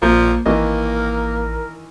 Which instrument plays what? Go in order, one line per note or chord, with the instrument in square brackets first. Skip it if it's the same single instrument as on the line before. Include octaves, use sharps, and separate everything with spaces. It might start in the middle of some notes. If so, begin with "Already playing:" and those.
[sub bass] A#1 [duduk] A#2 [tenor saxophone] F3 [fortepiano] A#3
[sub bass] A1 [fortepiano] D#3 E3 D#5 [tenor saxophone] A#3 [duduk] A#4